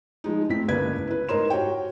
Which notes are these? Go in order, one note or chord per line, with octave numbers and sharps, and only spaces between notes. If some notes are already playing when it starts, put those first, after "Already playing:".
F3 G#3 D#4
A2 C4 B6
G1 C#2 A#3 B4 G#6
E4 B4
G#2 D#4 A#4 C5 C6 E7
F#4 G4 C#5 G5